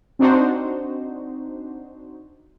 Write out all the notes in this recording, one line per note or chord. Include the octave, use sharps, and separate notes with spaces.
C4 D4 D#4 F#4 C5